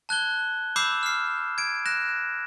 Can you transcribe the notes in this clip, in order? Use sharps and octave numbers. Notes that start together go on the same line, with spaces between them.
A5 F#6 G#6 G7
B5 D6 E6 G6 C7 E7
F6 C7
G#6 D7
F#6 A#6 E7